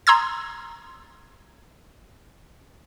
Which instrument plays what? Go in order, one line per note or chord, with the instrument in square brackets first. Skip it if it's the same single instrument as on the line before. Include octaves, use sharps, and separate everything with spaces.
[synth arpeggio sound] A#5 C6 D#6 E6 G#6 A6